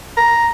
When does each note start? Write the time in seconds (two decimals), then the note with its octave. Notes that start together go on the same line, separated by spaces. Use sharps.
0.17 A#5